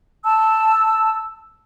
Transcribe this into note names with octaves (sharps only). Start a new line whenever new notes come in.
A5 E6